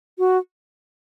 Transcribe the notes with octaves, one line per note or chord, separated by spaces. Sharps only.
F#4